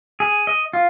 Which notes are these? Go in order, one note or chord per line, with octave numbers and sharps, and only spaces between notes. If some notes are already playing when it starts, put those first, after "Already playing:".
G#4
D#5
F4